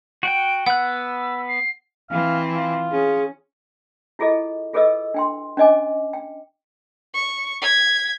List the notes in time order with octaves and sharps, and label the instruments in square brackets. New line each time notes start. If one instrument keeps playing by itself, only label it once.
[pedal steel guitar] F#4 F#5 G5 [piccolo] D7
[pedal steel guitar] B3 F#6 [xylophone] F#5 [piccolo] E6
[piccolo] C7
[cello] E3 C4 [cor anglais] F5
[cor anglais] F4
[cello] C#4 [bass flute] G#4
[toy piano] E4 F4 G#4 A4 D#5
F4 G#4 A4 B4 D#5 E6
D4 G5 C6
C#4 D4 D#5 G#5 D6
G5
[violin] C#6
G#6 B6